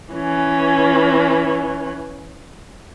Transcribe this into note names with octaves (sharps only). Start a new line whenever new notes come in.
E3 C#4